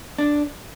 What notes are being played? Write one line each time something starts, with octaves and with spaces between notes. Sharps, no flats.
D4